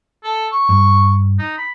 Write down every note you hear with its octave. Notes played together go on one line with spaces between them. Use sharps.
A4
C#6
G2
D#4
B5